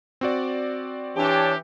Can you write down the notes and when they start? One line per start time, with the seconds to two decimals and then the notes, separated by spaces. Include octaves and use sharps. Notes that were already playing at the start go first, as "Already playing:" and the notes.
0.21 C4 F#4 D5
1.16 E3 D4 G4 C#5 A5